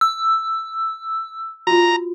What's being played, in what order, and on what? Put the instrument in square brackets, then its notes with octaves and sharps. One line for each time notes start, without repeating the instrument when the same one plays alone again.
[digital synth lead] E6
[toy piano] F4 F#4 [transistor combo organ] A#5